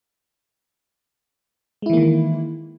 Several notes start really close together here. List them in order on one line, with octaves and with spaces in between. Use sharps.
G#3 E4 E3 A#3 D#3